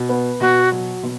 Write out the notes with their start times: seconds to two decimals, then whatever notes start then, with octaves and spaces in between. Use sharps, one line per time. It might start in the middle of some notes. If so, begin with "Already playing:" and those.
Already playing: B2
0.09 B3
0.40 B2 F#4
0.72 F#3
1.03 B2